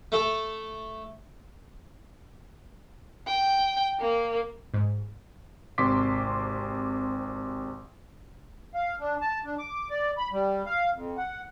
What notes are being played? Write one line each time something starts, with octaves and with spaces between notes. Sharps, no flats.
A3 A4
G5
A#3
G#2
G#1 C3 C6 D6 B6
F5
D4
A5
D4
D6
D5
B5
G3
F5
F2
F#5